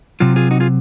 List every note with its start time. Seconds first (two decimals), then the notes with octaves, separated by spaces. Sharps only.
0.20 C3 F#3 C4 F4
0.36 F4 G#4
0.51 D#4 F#4
0.60 F4 G#4